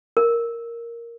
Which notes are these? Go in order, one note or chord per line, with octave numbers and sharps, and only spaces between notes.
A#4